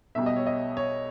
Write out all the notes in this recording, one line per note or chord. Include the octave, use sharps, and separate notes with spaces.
B1 B2 G3 E5
D#5
C#5
D#5
C#5